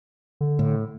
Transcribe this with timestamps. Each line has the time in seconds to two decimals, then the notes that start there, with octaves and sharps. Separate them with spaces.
0.41 D3
0.59 A2